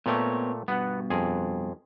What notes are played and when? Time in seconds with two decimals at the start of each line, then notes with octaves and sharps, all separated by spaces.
0.06 A#2 A3 B3 C4 C#5 G5
0.68 G2 B2 B3 F#5
1.10 F2 G#4